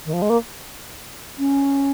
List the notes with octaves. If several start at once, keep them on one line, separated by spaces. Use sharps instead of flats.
D#3
F3
G#3
A#3
C#4